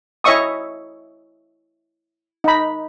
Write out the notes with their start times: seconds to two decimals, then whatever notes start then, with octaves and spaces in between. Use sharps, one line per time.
0.24 E4 C#5 D#5 E5 C#6 D#6
2.44 D#4 B5